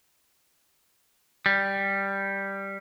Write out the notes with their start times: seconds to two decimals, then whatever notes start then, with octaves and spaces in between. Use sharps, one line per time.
1.46 G3